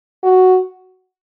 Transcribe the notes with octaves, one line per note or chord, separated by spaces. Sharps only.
F#4